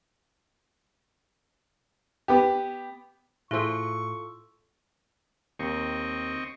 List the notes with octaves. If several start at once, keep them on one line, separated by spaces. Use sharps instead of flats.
B3 G4
A2 E4 F4 G#4 A4 C5 C#6
D#2 C4 D#5 C#6